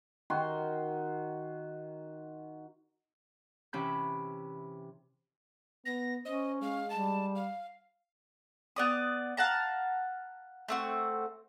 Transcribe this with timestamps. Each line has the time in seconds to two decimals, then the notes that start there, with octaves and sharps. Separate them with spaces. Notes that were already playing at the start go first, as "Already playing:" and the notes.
0.30 D#3 F#4 C6
3.73 C3 E3 C#4 B5 G6
5.86 B3 A#6
6.25 C#4 C5 D#5
6.62 G#3 F5
6.90 G3 A5
7.36 F5
8.76 B3 D5 D#6
9.37 F5 F#5 A5 A#5
10.68 A3 C4 F#4